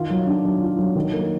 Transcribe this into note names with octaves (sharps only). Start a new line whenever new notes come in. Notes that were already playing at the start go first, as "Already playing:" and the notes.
Already playing: D#3 F4
F#3
D4
F#3
F4
F#3
D#3
A#3